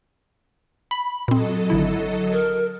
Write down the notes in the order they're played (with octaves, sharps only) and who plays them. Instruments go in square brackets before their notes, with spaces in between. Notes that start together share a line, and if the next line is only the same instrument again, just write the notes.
[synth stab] B5
[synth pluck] A#2 C4 [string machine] F#3 A4 D#5
[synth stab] G#1 D3 E4
[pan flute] A#4